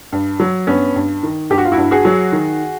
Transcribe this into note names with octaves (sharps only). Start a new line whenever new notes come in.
G2
F#3
G2 B3 C#4
G2
D#3
G2 G4
F#4
F4
E4 F#4
G2
F#4 G#4
F#3
D#3